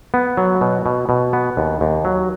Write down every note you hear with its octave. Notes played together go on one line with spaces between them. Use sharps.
B3
F#3
B2
B2
B2
B3
D#2
D#2
F#3